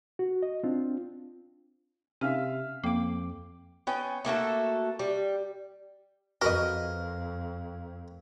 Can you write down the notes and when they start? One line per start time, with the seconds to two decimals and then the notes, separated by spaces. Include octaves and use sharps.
0.19 F#4
0.43 D#5
0.64 C4 D4 F4
2.21 C3 C#4 E5 F5 F6
2.84 F2 A#3 G5 D6
3.87 B3 C#4 G5
4.25 A3 A#3 F#4 A4
4.99 G3
6.42 F2 F#4 A#4 B4 D#5